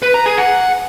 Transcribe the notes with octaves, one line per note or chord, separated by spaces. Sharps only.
B4
A#5
G#4
F#5